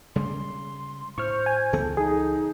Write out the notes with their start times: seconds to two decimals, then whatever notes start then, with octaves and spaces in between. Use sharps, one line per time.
0.16 C#3 G3 G#3 C6
1.18 A2 C5 C#6 F6
1.46 G#5
1.73 C#2 E3 B3 A4
1.97 D#4 G#4